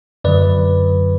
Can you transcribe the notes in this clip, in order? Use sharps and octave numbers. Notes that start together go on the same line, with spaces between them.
F#2 D3 F#3 B4 D5